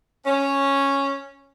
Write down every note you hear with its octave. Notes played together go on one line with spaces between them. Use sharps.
C#4